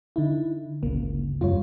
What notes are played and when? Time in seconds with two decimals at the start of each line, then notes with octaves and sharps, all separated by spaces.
0.16 D3 D#4 E4
0.83 G1 C#2 C#3 A#3
1.41 E1 F#2 G3 F4 C#5